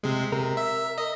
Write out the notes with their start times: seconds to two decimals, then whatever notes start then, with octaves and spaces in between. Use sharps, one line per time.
0.03 C3 G#3
0.32 C3 A#4
0.57 E5
0.98 D#5